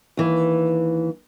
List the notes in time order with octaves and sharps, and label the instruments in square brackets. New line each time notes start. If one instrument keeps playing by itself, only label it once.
[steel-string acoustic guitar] D#2 E3